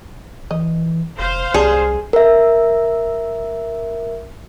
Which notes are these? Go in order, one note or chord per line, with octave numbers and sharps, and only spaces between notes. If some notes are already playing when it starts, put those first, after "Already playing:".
E3 D#5
F1 C5 F5
C2 G3 C#4 G#4 A5
A#4 E5